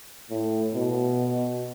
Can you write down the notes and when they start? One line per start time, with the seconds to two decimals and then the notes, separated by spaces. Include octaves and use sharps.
0.30 A2
0.74 B2